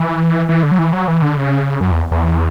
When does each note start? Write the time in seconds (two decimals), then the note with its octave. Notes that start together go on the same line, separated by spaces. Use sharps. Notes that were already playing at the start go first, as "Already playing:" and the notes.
Already playing: E3
0.49 E3
0.63 D3
0.71 F#3
0.78 E3
0.93 F#3
1.08 E3
1.22 D3
1.37 C#3
1.81 F#2
1.91 E2
2.11 E2